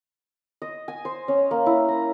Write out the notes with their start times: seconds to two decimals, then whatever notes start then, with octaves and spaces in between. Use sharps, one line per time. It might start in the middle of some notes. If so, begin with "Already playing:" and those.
0.62 D#5
0.88 G#5
1.05 C5
1.28 C#4
1.51 A#3
1.66 E4
1.88 A#5